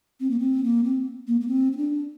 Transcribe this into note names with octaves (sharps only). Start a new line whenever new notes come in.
C4
A#3
C4
A#3
C4
A#3
A#3
C4
C4
D4